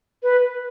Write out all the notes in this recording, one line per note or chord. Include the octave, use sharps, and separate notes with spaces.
B4